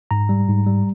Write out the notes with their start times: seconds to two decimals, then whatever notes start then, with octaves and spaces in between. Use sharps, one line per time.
0.11 G#2 A#5
0.29 G3
0.48 G#2
0.67 G3